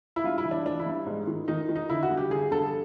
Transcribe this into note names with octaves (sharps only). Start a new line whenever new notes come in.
E4
G2 F4
E4
E3
D4
E3 D4
E4
G2
G#2
D#3
D#3 D#4
D#3
D#4
D3 E4
F#4
G2
G4
D3 G#4
G2 A4